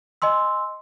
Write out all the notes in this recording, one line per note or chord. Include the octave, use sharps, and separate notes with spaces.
D#5 G#5 C6 E6